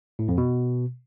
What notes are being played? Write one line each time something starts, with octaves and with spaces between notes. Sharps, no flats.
A2
F2
B2